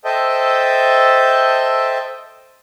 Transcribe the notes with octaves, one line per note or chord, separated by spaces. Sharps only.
A4 C5 D#5 E5 G5 A5